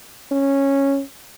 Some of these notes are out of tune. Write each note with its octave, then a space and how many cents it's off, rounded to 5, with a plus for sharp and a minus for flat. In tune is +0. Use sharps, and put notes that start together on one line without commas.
C#4 -10